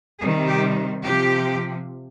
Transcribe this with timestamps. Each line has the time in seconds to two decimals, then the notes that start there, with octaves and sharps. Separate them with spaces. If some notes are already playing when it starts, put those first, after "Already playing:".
0.20 C3 D#3 G3 G#4
0.49 G4
1.04 C3 F3 G4